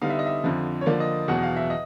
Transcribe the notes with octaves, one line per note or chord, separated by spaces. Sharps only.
D3 G3 B3 D#4 F5
E5
D#5
E5
F2 D3 F3
C#5
D3 F3 A#3 D5
D#5
E2 B2 F#3 F#5
F5
E5
D#5